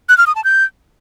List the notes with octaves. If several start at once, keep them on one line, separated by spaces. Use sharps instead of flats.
F#6
F6
D#6
A5
G6